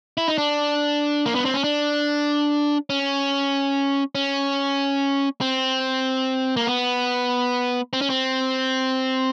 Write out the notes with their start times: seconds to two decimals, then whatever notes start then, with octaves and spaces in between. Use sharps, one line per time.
0.17 E4
0.28 D#4
0.38 D4
1.26 A#3
1.35 B3
1.45 C4
1.54 C#4
1.64 D4
2.90 C#4
4.15 C#4
5.41 C4
6.57 A#3
6.67 B3
7.93 C4
8.01 C#4
8.10 C4